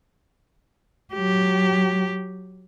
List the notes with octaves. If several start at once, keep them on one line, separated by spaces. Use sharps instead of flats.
F#3 G4